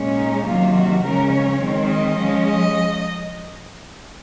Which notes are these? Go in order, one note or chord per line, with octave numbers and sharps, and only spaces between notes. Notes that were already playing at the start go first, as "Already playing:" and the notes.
Already playing: A#2 G#3 C#4
D#4
C3 D#3 F#3 A#3 F4
F#4
C#3 F3 G#3 C#4 A#4
C#5
D#3 G#3 C4
D#5
F3 G#3 C#4
D#5